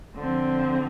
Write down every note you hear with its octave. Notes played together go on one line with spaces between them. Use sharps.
D3 F3 C4